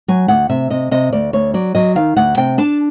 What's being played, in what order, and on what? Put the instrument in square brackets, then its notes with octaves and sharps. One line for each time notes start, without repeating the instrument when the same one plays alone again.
[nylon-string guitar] F#3 G#5
D2 F#5
C3 E5
C3 D#5
C3 D#5
D2 D5
D2 C#5
F#3 D5
F#3 D#5
D#3 F5
D2 F#5
C3 G5
D4 A5